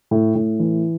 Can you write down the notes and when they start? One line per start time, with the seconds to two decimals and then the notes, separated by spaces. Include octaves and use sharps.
0.11 A2
0.35 A2
0.59 E3